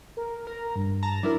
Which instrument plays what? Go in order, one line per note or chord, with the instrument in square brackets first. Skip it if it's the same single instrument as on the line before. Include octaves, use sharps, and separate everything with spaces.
[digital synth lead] A#4
[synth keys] A#4 [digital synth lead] A#5
[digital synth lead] G2
[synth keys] A5 A#5
[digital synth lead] F#3 [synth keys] D4 E4 A#4